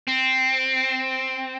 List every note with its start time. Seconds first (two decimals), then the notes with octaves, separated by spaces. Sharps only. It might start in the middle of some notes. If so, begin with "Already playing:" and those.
0.07 C4